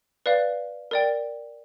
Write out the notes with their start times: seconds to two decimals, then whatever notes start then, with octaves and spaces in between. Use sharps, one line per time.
0.26 B4 D5 F5
0.91 A#4 D5 G5